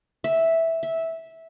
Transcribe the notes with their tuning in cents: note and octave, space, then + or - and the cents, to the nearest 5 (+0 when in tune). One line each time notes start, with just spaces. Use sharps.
E5 -5
E5 -10